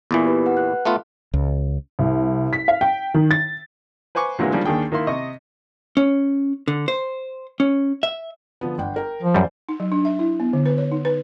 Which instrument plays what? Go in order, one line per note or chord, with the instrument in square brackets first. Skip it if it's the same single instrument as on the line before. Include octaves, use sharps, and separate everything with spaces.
[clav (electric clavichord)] E2 A#2 E3 [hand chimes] B3
[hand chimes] G4 B4
B4 F#5
F#6
[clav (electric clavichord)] A3 B3 F4
[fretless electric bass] C#2
[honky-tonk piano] C2
B6
F5
G5
D#3
A6
[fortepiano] B4 C5 G#5 C#6 D6
A#2 D3 E3 F#3 G#3 A#3
D#3 F3 G3 G#3 A#3 D4
D#2 D#3 D4 G#4 G5
D#3 A#3 E4 C6
C3 D#5 C#6
[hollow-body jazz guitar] C#4
D3
C5
C#4
E5
[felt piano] D3 F3 B3
G1 F#5 G5
A#4 G5
[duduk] F3
[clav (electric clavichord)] F#2 G3 [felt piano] C5 D5
[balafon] D#4
F#3
D4
E5
E4
B3
D3
B4
C#5
D#4
B4